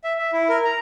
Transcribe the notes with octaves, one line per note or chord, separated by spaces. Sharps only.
E5
E5
E4
A#4
A#5